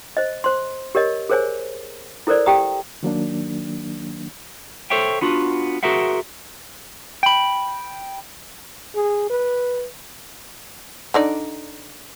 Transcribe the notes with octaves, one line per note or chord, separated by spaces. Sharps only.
C5 D#5
C5 C6
G4 A#4 C#5 D#5
G#4 A#4 C5 C#5 G#5
E4 A4 A#4 C5 D5
G4 G5 A#5 D#6
D#3 F#3 A#3 D4
A4 C5 C#5 E5 G5
B3 D4 F4 F#4
F#4 G#4 A#4 C5 E5 F#5
G5 B5
G#4
B4
D3 D#4 D5